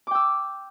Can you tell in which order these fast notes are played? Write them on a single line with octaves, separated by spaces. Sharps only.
D6 G5 E6